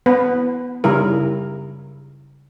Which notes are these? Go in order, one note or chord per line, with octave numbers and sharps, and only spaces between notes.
B3 B4
C#3 G3 E4 A#4